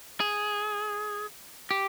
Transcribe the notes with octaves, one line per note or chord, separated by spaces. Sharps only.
G#4
G4